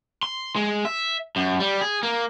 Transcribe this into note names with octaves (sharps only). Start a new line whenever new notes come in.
C6
G#3
E5
F#2
G3
G#4
A#3